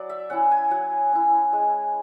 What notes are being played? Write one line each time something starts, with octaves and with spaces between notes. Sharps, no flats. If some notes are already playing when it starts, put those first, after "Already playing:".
Already playing: F#3 D5
E5
C#4 E4 F#5
G#5
F#3 F#5
C#4 E4
G#3